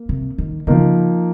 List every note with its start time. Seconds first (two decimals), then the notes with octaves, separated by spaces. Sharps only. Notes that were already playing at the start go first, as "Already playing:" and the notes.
Already playing: A#3
0.09 C3
0.38 D#3
0.67 C#3 F3 A#3 D#4